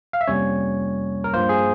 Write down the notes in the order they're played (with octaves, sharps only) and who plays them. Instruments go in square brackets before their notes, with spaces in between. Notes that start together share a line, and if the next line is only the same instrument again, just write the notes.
[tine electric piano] F5
E5
F2 C3 G3 A#3 C#4 C#5
A#4
G2 F3 A#3 C5
G#4